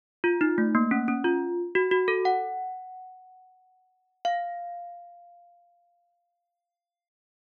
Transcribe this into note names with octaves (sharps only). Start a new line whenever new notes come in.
F4
D#4
A3
A#3
C#4
C#4
F4
F#4
F#4
A4
F#5
F5